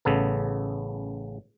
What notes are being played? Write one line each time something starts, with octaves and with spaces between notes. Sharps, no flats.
A1 C#3 B3 A4